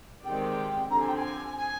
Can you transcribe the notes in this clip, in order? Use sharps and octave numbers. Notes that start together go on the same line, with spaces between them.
D#3 G#3 C4 G4 D5 G5
D3 F3 C4 G4 A#5
G#5
G5
G#5
G#5